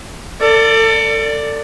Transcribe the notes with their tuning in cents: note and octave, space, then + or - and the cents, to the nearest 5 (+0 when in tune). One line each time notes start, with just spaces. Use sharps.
A4 +35 D5 +0